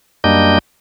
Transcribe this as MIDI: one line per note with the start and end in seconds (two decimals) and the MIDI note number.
0.24 0.58 42
0.24 0.58 55
0.24 0.58 58
0.24 0.58 62
0.24 0.58 75
0.24 0.58 91